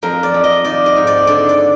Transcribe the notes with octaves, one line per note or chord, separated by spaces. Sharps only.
F2 A#4
D5
F2
D#5
D#3 D5
D#5
G#2
D5
D3 D5
D5